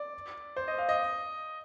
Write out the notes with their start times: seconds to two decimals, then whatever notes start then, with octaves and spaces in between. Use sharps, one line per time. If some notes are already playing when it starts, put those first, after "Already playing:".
Already playing: D5
0.56 C5
0.68 D#5
0.78 F5
0.89 D#5